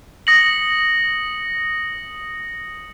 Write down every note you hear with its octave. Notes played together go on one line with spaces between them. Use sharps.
D#6 A#6 C#7 F#7